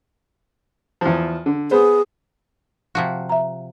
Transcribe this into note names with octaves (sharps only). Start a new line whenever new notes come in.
E2 F3
D3
B3 G#4 C5
C3 F3 F#4
E5 A#5